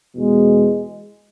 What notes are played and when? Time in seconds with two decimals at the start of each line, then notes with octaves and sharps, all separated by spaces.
0.14 E2 B2 G#3